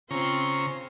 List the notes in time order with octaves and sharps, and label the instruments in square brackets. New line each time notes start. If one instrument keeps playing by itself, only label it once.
[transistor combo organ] C#3 A#5 C#6 [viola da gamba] C4 F4 C5